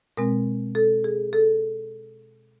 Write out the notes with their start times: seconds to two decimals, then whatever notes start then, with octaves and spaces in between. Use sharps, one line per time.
0.17 B2 G#3 C4 A#4
0.75 A4
1.04 G#4
1.33 A4